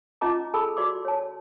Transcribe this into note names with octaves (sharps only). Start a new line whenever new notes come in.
C#4 F4 D#5 A5 A#5 D6
G#4 A4 A5 B5 E6
F#4 D5 C6 D6
C#5 A5